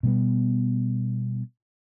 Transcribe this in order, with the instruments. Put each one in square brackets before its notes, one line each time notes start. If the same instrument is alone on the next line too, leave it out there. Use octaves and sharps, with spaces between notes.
[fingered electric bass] B2 G3 B3